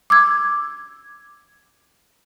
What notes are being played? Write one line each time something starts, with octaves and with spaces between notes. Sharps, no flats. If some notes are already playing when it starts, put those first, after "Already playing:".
D6 E6 G#6